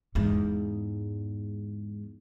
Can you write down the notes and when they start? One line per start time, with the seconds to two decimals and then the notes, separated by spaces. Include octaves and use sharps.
0.15 E2 G#2